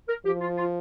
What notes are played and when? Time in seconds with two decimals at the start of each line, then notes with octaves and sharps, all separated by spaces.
0.08 A#4
0.25 F3 G4
0.41 F4
0.57 F4